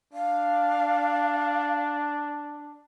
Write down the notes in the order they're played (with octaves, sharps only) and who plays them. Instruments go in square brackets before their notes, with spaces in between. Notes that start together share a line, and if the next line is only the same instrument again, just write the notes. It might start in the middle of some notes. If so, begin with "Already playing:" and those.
[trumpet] D4 [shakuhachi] F5